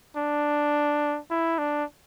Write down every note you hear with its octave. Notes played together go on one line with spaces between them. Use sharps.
D4
E4
D4